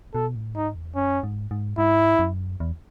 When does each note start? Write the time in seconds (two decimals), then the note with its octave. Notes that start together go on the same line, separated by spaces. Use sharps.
0.14 B2 A4
0.35 A2
0.55 G#2 D#4
0.75 E2
0.96 F#2 C#4
1.23 G#2
1.51 G#2
1.78 G#2 E4
2.19 F#2
2.60 E2